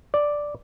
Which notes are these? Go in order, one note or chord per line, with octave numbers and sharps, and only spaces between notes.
D5